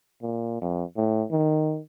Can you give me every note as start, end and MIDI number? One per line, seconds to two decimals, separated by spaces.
0.23 0.57 46
0.62 0.84 41
0.97 1.25 45
1.31 1.80 51